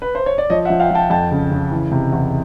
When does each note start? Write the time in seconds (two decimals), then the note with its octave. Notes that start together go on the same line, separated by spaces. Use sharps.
0.02 B4
0.15 C5
0.26 C#5
0.38 D5
0.50 F3 C#5 D#5
0.65 E5 F#5
0.70 F3
0.80 F5 G5
0.91 F3 G5 A5
1.10 F2 G5 A5
1.31 C#3
1.51 C#3
1.71 E3
1.92 C3
2.12 E2